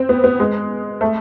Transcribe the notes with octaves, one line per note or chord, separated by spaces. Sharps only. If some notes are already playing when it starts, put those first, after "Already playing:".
Already playing: C4
B3
B3
G#3
A3